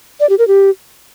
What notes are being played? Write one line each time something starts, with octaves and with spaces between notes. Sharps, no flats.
D5
G4
A#4
G4